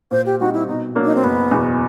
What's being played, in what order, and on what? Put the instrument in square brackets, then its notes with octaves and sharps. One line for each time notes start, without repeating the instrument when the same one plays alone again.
[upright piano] A#2 [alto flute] C5
[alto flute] G4
[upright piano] G3 C4 D#4 [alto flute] F#4
[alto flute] E4
[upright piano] B2 [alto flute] D#4
[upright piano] F#3 A#3 D4
[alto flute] D#4
C4
[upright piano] F#1 [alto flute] B3
[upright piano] E2 B2